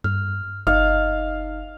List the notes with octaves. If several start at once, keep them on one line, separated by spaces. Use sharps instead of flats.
G2 F6
F#1 D#4 D#5 F5